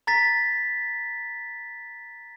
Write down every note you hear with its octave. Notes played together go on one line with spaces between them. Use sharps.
A#5 A6 B6